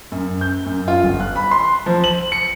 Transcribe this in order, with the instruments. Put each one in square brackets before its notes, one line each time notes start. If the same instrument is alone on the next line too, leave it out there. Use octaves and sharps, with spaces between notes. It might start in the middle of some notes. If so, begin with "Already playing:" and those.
[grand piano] F#2
G6
F#2
F4
G1
F#6
B5
C6
F3
F#7
C#7